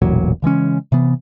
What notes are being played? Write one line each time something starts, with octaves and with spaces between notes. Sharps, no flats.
E1 A1 A#2 F#3
C#3 E3 G#3 C#4
C3 E3 B3